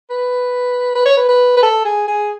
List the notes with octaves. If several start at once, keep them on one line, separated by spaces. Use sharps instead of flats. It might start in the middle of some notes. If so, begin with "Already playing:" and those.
B4
B4
C#5
B4
B4
B4
A4
G#4
G#4